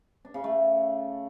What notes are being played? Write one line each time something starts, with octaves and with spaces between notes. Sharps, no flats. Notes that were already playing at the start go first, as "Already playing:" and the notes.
D4
C#3
A3